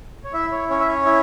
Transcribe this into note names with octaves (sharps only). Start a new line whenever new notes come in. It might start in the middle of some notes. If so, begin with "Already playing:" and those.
C#5
E4 E5
C#5
C#4 C#5
E5
C#5
E4